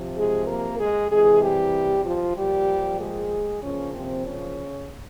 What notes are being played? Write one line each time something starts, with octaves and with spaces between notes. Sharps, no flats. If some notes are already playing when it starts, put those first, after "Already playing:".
Already playing: C3 F3
G#3 G#4
A#3 A#4
G#3 G#4
C3 E3 G#3 G#4
G3 G4
F3 F4
A#2 F3 G3 G4
G#3 G#4
A#2 C#3 F3 C#4
C3 C4
C#3 C#4